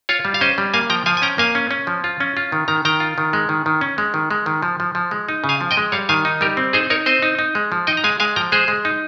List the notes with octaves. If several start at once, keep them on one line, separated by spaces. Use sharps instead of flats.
F4 C#5 F5
G3
F5
C#4 C5 D#5
G3
A#3 F5 G#5
F3 G5 A#5
F3 F5 G#5
G#5
C#4 G5 A#5
A#3 F5 G#5
C#4
C#4
F3
F4
C#4
F4
D#3
D#3 A#5
D#3 G5 A#5
F4
D#3
G#3
D#3
D#3
C#4
G#3
D#3
G#3
D#3
F3
F3
F3
G#3
D#4
C#3
F5 G#5
F3
D#5 G5
G#3
G3 C#5 F5
D#3 F5 G#5
D#4
G3 G4 A#4
C4
D#4 G#4 C5
D#4 A#4 C#5
C4 C5 D#5
D#4
D#4
G#3
F3
D#4 D#5 G5
A#5
G#3 F5 G#5
G#3 F5 G#5
F3 G5 A#5
G#3 G#4 C5
G#3
D#4